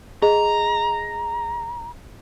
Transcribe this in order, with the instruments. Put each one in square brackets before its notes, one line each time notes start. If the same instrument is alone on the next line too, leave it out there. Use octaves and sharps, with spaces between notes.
[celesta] G#4 D#5 [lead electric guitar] A#5